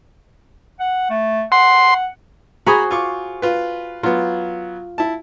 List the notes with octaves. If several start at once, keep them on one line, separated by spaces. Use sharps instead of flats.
F#5
A3
F#5 C6
F#4 G#4 C5 G#5 A#5 B5
F4 C#6 D6
F4 B4
F#3 B3 F4
E4 A5